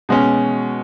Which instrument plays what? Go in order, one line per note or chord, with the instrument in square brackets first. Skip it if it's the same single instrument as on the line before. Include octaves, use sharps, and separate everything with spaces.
[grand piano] B2 G#3 C#4